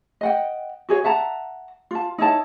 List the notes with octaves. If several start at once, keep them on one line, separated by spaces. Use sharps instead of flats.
D#5 F#5 G5
F#4 G#4 C#5
E5 F#5 A5 A#5
F4 A5
D#4 E4 C#5 A5